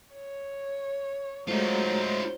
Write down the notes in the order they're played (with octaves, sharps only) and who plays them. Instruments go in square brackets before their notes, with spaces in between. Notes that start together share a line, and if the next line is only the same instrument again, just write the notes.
[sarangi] C#5
[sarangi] F#3 [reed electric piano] G#3 A3 [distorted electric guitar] D#4 F4 [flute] C5